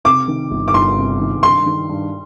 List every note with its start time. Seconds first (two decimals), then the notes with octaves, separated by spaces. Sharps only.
0.04 C3 D6
0.28 D#3
0.51 G1
0.68 D6
0.74 G1 C6
0.97 C3
1.20 D#3
1.43 G2 C6
1.66 D#3
1.89 G2